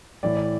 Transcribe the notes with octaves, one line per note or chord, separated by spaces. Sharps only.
A2 E3 D5
D5